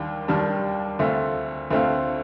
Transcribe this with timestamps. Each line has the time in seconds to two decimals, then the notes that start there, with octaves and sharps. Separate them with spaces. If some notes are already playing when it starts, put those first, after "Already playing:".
Already playing: D#2 D#3 G3 D4
0.28 D#2 D#3 G3 D4
0.99 D2 D3 A3 C4 F4
1.71 D2 D3 A3 C4 F4